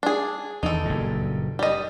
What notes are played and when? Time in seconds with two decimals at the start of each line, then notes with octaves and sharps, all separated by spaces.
0.03 D4 G#4
0.63 E2 D#3 D#4 A4
0.85 F#1 G2 A#2
1.59 G3 D#5